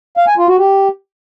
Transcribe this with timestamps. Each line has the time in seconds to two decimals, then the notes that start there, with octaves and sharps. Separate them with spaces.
0.17 F5
0.27 G#5
0.38 F4
0.48 F#4
0.58 G4